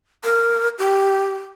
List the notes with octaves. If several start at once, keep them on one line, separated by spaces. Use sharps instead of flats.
A#4
G4